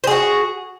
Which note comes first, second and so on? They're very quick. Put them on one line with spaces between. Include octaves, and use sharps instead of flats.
C5 G#4 F#4